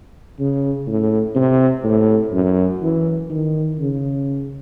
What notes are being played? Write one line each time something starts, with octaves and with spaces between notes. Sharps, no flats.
C#3
A2
C3
A2
F#2
E3
D#3
C#3